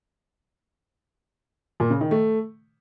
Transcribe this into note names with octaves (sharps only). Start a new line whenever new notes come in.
A#2
C#3
D#3
A3